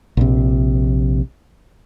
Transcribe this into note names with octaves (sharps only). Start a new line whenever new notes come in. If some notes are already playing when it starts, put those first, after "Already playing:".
A#1 C3